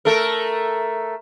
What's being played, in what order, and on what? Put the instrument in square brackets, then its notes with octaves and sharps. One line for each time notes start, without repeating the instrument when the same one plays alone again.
[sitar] A3 A4 A#4